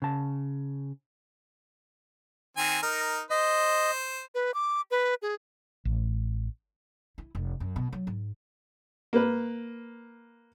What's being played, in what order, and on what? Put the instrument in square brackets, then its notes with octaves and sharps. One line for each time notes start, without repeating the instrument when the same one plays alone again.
[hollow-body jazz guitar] C#3 A5
[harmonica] D#3 C4 G#5
D#4 A#4
[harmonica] C5 [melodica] D#5
[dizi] B4
D6
B4
G#4
[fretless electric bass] A1
[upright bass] E4
F1
F#2
B2
F#3
G#2
[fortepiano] A#3 B4